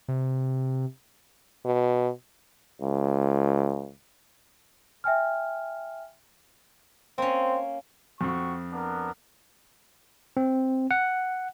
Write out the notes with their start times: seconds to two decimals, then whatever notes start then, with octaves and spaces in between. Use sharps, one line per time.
0.08 C3
1.66 B2
2.82 C#2
5.04 E5 G5 G#5 F6
7.18 A#3 C4 C#4
8.21 F2 C4 F#4 C#6
8.73 B3 D4 A#4
10.37 C4
10.91 F#5